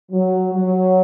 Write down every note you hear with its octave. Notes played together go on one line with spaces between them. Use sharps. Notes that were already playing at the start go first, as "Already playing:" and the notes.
F#3
F#3